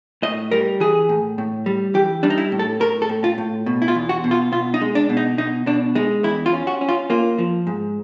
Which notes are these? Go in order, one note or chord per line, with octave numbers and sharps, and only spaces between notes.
A2 D#5
G3 A#4
E3 G#4
A2
A2
G3
E3 G4
G3 D4
D#4
E4
A2
A4
A2 A#4
A4
A2
F4
A2
B2
E4
F4
E2
F#4
B2
F4
B2 F4
D#4
G#3
D4
B2
D#4
B2 D#4
B2 D4
G#3 D#4
E2 E4
F4
C#4
F#4
C#4
F4
A#3 F4
F3
G#2